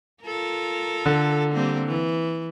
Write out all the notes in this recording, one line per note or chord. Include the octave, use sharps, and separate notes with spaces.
F4 A4 A#4
D3
G3 A#3 C4
E3